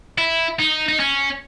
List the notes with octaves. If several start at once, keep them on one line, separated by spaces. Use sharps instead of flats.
E4
D#4
D#4
C#4